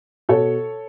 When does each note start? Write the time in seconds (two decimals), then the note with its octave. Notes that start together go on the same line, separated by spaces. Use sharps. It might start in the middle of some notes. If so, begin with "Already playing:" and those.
0.29 B2 A4 C#5